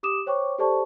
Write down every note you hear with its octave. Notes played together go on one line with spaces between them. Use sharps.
G4 D6 D#6 E7
C5 C#5 G5 C#6 D6
G4 A4 C5 D5 A5 C#6